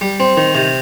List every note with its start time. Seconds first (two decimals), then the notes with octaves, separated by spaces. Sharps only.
0.01 G3
0.20 C4
0.37 D#3
0.55 C3